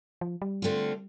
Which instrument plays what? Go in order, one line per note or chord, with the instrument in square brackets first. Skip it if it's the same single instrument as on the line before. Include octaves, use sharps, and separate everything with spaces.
[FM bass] F3
G3
[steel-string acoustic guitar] D3 A3 C4 F4